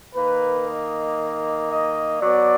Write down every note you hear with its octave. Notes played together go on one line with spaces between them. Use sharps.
D#3 A#3 B4
D#5
D#5
B2 F#3 B3 D5